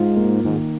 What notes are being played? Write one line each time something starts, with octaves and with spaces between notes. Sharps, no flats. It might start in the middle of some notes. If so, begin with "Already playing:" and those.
Already playing: G#2 F4
A#3
G#2 D#3